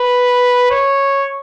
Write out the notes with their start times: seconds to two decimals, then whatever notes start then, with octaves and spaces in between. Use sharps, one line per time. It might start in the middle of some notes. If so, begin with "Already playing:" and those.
Already playing: B4
0.71 C#5